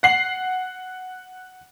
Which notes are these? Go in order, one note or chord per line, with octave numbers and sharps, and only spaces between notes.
F#5 C7 F#7